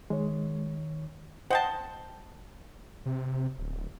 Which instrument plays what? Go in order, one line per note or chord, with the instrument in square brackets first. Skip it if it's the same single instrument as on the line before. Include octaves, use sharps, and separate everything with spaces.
[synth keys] D#3 C#5 [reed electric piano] G#3
[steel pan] C5 D#5 [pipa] F#5 G5 A5
[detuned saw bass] C3
D1